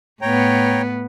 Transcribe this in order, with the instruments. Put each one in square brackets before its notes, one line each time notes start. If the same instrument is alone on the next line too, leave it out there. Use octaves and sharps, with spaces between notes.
[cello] A2 B3 [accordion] C#5 G5 A#5